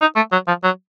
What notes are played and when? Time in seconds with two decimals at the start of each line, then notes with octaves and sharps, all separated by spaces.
0.01 D#4
0.16 A3
0.32 F#3
0.48 F3
0.64 F#3